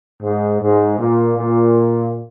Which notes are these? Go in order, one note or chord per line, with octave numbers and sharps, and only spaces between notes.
G#2
G#2
A#2
A#2